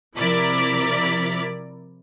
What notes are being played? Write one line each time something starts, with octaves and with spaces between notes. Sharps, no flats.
C3 F3 E4 A#4 D5 B6